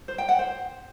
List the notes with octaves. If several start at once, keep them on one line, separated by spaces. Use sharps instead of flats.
C5
G5
F#5
C5